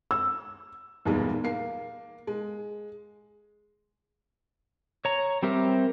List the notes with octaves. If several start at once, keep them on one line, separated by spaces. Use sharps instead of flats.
E6
B1 E2 A#2 E3 G3 G#3
A#3 C7
G#3
C#5 A#5
G3 C4 G4 A#4 E5